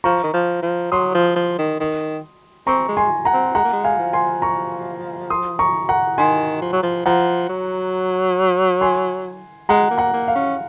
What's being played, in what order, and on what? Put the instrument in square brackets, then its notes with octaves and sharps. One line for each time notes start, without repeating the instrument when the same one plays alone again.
[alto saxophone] F3 [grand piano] A#5 C#6
[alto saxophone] D#3
F3
F3
[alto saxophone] F#3 [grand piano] C6 D#6
[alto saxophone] F3
F3
D#3
D#3
[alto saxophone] C4 [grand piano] A#5 C#6
[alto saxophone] G#3
[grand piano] G#5 C6
F#5 A#5
[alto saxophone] C4
[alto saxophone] G#3 [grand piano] F#5 A#5
[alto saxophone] A#3
G#3
[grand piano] F5 G#5
[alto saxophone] F3
[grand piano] G#5 C6
A#5 C#6
C6 D#6
A#5 C#6
F#5 A#5
[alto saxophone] D#3 [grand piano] G#5 C6
[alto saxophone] F3
F#3
F3
[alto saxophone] F3 [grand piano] F#5 A#5
[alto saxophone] F#3
[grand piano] G#5 C6
[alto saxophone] G#3 [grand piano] F#5 A#5
[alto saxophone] A#3
[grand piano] F#5 A#5
[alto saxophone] A#3
[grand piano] F5
[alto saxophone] C#4